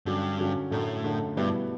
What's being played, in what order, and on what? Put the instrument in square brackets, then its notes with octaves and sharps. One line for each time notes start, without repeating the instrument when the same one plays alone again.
[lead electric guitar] G2 [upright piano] D3 F#3 C#4
[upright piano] D3 F#3 C#4
[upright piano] F#2 D3 A3 [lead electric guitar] A2
[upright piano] F#2 D3 A3
[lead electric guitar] G2 [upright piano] B2 G3 B3 E4